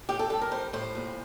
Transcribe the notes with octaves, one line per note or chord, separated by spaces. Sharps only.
A2 G4
A4
G3 A4
A#4
G3 C5
A2 C5
A#2